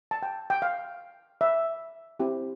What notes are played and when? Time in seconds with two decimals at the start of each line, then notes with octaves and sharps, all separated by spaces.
0.11 A5
0.23 G5
0.50 G5
0.62 F5
1.41 E5
2.19 C4 E4 G4